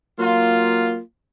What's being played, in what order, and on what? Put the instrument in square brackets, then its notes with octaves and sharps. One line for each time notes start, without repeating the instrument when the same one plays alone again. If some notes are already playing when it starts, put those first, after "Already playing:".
[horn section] F#3 A#3 F4